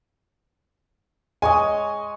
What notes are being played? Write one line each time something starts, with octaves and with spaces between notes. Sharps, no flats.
G#3 C#5 D#5 G#5